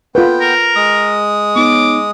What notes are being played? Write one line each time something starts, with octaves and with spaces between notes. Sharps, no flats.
B3 F4 A4 B4 G5
A#4
G#3 D#6
B3 D#4 C#5 D6